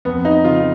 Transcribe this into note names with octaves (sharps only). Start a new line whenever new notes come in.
F2 B3
D#4
C#3 F4